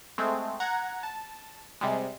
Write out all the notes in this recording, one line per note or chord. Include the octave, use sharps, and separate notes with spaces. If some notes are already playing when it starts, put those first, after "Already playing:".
G#3 A3 C4
F#5 A#5 G#6
A5
C3 G3 G#3